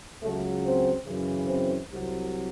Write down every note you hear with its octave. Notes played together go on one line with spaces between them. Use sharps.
C#2 C#3 F#3 A3
C4
F#2 C#3 E3
C4
C2 C3 F#3